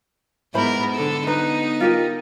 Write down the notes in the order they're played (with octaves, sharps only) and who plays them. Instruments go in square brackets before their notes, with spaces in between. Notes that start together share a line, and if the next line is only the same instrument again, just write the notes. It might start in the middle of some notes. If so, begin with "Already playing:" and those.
[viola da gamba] G#2 B3 A#4 [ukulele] E4 C5 B5
[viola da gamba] D3 A4
[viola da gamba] B3 D#4 [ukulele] B4 A#5
[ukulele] F4 G4 A#4